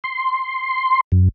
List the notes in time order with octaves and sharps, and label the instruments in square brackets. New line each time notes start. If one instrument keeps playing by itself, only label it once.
[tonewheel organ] C6
F#2